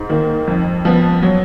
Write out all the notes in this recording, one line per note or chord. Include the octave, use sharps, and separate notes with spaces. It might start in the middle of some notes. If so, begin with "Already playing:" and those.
Already playing: G#2
D#3 A#3
F2
F3 B3
F#3